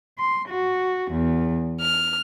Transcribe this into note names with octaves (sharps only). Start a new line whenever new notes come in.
C6
F#4
E2
F6